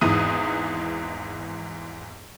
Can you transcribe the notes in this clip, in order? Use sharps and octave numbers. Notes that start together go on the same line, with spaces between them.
G#1 E2 G#2 E3 D#6 D#7